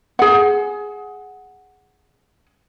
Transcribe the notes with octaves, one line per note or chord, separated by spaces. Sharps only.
G#4 F#5